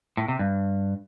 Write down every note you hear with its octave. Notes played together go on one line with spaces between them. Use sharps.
A2
C3
G2